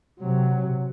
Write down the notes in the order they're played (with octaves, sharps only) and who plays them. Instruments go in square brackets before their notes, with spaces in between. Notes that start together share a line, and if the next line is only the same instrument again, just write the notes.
[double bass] C3 F#3